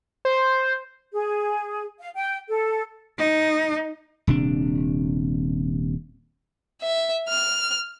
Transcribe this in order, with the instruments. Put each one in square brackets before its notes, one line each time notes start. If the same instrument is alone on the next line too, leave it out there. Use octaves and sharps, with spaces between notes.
[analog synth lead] C5
[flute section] G#4
F5
G5
A4
[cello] D#4
[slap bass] D#1 C3 D4
[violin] E5
F6